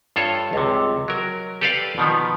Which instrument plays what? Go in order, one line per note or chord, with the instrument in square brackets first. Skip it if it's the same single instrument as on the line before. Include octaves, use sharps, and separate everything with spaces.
[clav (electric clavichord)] G2 F4 A4 C#5
C#2 C3
F#3 A#4
G4 A4 B4 D5 F5 G5
B2 D#3 F3 B3